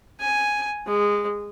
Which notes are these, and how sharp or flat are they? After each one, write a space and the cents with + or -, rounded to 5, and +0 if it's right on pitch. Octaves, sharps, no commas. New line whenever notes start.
G#5 +0
G#3 -15